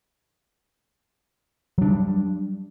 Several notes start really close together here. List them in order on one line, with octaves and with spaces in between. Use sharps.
F#3 D4 G3